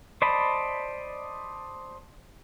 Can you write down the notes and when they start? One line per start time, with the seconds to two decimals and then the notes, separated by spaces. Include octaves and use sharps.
0.22 C5 D5 D#5 A5 B5